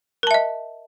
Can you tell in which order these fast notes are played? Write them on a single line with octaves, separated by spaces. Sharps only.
A#4 A5 E5 D#5